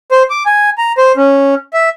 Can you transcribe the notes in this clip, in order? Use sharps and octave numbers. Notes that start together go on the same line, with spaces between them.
C5
D6
G#5
A#5
C5
C#4
E5